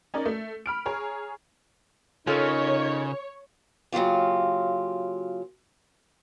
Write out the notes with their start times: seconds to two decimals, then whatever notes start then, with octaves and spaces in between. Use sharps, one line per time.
0.14 C#4 D#4 A#4 D5
0.26 A3
0.66 B5 F6 D7
0.86 G#4 C#5 A#5
2.27 C#3 D#4 F4 A4 A#4 C#5
3.92 C#3 F#3 A#3 F4 G4